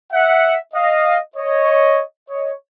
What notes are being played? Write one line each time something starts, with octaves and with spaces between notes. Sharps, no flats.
E5 F#5
D#5 F5
C#5 D#5
C#5 D#5